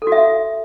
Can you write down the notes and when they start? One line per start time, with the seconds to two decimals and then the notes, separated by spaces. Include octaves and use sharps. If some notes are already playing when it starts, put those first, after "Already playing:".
0.02 A4
0.07 F#4
0.12 E5